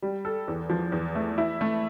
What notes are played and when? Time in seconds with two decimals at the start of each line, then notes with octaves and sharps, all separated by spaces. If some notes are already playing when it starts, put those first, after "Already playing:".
0.02 G3
0.25 A4
0.48 E2
0.70 F3
0.92 E2
1.15 A3
1.38 E4
1.61 A3